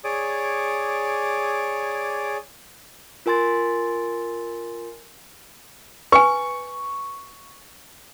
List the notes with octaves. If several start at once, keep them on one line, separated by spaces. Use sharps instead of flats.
G#4 C#5 D5 D6 D#6
F4 A#4 G#5 C6 A6
B4 G#5 C#6